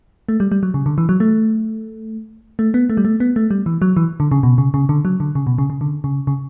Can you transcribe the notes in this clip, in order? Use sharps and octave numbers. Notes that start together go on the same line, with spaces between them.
A3
G3
G3
F#3
C#3
D3
E3
F#3
A3
A3
B3
A3
G3
A3
B3
A3
G3
E3
F#3
E3
D3
C#3
B2
C#3
C#3
D3
F#3
D3
C#3
B2
C#3
C#3
D3
C#3
C#3